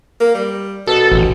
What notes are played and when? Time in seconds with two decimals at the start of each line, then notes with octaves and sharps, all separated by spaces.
0.20 A#3
0.34 G3
0.87 B2 A4
1.12 A1